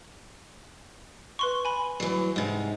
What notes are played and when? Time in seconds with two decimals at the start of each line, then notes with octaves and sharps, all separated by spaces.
1.39 B4 C6 C#6
1.65 G#5 B5
2.00 E3 F#3
2.36 G#2 C3